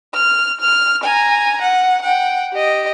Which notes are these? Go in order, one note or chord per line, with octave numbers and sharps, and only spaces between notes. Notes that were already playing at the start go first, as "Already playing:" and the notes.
F6
F6
G#5 A#5
F#5
F#5 G5
G4 D#5